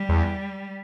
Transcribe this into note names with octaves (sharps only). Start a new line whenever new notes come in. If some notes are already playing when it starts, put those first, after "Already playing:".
Already playing: G3
E2